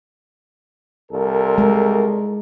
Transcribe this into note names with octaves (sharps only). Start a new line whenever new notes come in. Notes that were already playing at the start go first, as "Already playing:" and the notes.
C2 A4 A#4
G#3